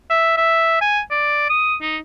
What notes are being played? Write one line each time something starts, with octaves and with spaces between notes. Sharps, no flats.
E5
E5
G#5
D5
D#6
D#4